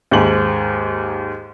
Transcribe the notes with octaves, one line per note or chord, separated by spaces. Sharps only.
D#2 G#2 F#7